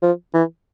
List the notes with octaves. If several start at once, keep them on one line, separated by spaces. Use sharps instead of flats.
F3
E3